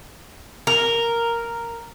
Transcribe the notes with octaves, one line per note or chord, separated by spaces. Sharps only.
A#4